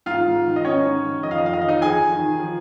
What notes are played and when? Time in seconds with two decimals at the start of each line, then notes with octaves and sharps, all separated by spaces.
0.06 G#2 F4 F5
0.20 G#2
0.35 D#3
0.50 D#3
0.56 D#5
0.65 G#2 C#4 C#5
0.80 G#2
0.93 D#3
1.09 D#3
1.23 F2 D#5
1.31 F5
1.37 F2 D#5
1.46 F5
1.52 D#3 D#5
1.61 F5
1.67 D#3 D#4 D#5
1.81 F2 G#4 G#5
1.96 F2
2.11 D#3
2.25 D#3
2.39 F3